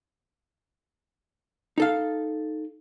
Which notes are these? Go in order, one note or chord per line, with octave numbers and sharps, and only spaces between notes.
D#4 A4 F5